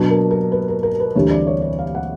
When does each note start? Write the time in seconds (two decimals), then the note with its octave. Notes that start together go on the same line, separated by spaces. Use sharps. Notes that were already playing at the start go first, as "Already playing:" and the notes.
Already playing: B2 F#3 B3 D4
0.10 A#4
0.31 A#4
0.52 B4
0.68 A#4
0.83 A#4
1.00 B4
1.15 D2 C3 E3 G3 C4 C#5
1.31 D5
1.47 C#5
1.62 C#5
1.79 F5
1.95 F#5